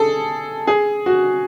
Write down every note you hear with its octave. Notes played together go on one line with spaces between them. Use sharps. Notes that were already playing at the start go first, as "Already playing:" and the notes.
Already playing: G#4 A4
G#4
F#4